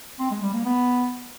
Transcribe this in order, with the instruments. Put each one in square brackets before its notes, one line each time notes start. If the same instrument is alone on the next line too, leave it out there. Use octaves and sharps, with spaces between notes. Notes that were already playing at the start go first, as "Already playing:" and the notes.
[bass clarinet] C4
G#3
G3
A#3
B3